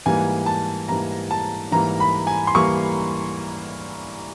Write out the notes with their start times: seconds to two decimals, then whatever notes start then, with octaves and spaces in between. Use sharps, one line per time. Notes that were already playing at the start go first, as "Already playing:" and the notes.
0.06 G#2 E3 G3 A#3 G#5
0.46 A5
0.89 G#2 E3 G3 A#3 A#5
1.31 A5
1.72 G#2 E3 G3 A#3 A#5
2.00 B5
2.27 G#5
2.47 C6
2.55 E3 G3 A#3 C#6